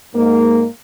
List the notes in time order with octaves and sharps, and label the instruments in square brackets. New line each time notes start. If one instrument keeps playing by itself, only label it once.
[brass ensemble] G#2 A#3